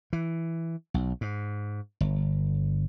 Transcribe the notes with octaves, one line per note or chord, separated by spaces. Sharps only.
E3
B1
G#2
G1